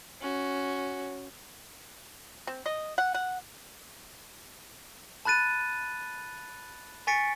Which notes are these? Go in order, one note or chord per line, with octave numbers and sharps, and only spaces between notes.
C#4 F#4
C4
D#5
F#5
F#5
A5 B5 F#6 A6 D#7
G#5 C#6 A6 B6 C#7 D7